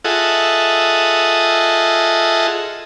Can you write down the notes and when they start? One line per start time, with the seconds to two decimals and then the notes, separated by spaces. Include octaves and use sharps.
0.04 F4 G#4 A4 D#5 E5 F#5